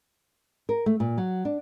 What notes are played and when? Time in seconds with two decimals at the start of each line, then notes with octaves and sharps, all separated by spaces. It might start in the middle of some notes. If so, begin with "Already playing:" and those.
0.69 A#4
0.86 A3
1.00 A#2
1.18 F#3
1.45 D4